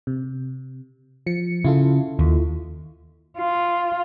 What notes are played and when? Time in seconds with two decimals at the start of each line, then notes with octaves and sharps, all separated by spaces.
0.07 C3
1.26 F3 C#7
1.65 C#3 E4 F4 A4
2.19 D#2
3.38 F4